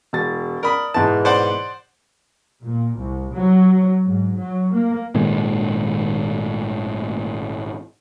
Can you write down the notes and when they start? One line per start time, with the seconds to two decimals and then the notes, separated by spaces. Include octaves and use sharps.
0.13 E1 A6
0.63 A#4 D5 B5 D#6
0.94 G#2 B2 E3 A5
1.25 C5 D5 F#5
2.64 A#2
2.98 C2
3.35 F#3
4.05 G#2
4.40 F#3
4.73 A#3
5.15 G#1 A#2 D#3 G#3